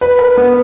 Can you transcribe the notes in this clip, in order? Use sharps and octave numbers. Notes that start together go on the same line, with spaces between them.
B4
A#4
B3